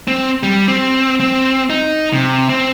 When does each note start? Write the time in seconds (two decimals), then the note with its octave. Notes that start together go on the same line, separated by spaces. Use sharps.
0.08 C4
0.43 G3
0.68 C4
1.20 C4
1.70 D#4
2.13 C3
2.49 C4